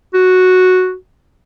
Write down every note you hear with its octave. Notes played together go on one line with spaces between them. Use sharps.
F#4